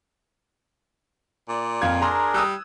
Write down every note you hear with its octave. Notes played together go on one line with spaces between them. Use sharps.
A#2 D5
F2 F5 G#6
D4 G#4 A#4 A#5 C6
G3 D#6 E6 F#6